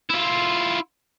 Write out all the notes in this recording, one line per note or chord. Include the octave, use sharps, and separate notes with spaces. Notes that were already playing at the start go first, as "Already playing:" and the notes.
E4 F4